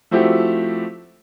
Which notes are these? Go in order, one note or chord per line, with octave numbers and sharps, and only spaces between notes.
F3 A3 C4 E4 F#4 G4